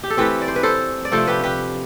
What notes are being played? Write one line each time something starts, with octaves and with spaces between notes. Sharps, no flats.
G4
A4
E3 A3 C4 G4 B4
D5
C5
B4
A4 C5
D5
C3 F3 A3 D4 A4 C5
G4 B4
G4 B4